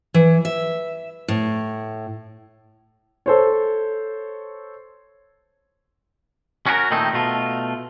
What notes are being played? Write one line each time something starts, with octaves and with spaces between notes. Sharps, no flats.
E3
E5
A2
A4 C5 C#5
C#4 F#4 G#4 A#4
A#2 D#3 A3 C4 D#4
B2 A3 F4